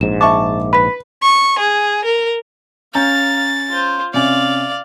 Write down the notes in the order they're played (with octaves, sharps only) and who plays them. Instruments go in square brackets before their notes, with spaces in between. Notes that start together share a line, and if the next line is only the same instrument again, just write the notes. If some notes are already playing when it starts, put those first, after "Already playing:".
[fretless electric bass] A#1 G#2 [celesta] E7
[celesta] E5 D6 [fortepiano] A5 C#6
[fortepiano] B4 [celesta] B5 B6
[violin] C#6
G#4
A#4
[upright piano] C#4 A#5 G6 [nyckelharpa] F5 [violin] A6
[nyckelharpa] F4 C5
[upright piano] C3 C#4 [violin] D5 [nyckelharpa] F5